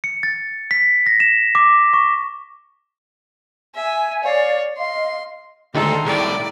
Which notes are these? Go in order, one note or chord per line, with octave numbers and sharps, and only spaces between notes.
C#7
A6
B6
A#6
E7
D6
C#6
E5 G#5
C#5 D5 F5
D#5 F5 C6
D2 D#3 G#3 A3 A4 A#5 C6
C2 A2 E4 D5